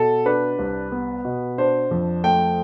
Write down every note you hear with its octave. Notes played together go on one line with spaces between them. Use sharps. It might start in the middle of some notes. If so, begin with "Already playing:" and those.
Already playing: B2 A4
D4 B4
C2
B3
B2
D4 C5
F2
A3 G5